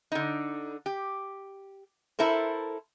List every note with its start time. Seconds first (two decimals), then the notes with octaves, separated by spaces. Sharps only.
0.12 D3 D#4
0.86 G4
2.19 E4 A4 A#4 C5